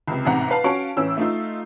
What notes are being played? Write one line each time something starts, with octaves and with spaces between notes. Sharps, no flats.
C#2 C3
A1 G#2 C3 F#5 A#5
B4 F5 A5
C#4 F#4 F5 A5 C#6 D7
A1 E3 C#4 E6
A3 D#4 F4